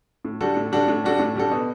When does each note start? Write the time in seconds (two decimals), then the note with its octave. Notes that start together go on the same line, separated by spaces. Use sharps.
0.25 A2
0.41 G3 D4 F#4 A4
0.56 A2
0.72 G3 D4 F#4 A4
0.88 A2
1.04 G3 D4 F#4 A4
1.20 A2
1.36 G3 D4 F#4 A4
1.51 B2